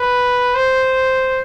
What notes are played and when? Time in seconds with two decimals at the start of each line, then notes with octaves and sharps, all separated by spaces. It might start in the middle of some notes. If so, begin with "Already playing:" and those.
Already playing: B4
0.55 C5